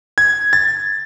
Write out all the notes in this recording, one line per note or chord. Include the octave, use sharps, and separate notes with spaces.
G#6
A6